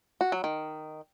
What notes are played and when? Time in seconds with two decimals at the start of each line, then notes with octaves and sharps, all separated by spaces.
0.21 F#4
0.32 F#3
0.44 D#3